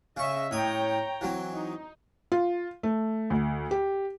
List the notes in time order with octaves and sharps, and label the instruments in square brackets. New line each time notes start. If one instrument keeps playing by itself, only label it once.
[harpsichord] C#3 C#6 [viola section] C#4 D#5 E5
[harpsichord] A2 D#6 [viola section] C#5 G5 A#5
[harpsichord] E3 F#3 C4
[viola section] D#4
[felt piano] F4
A3
D2
G4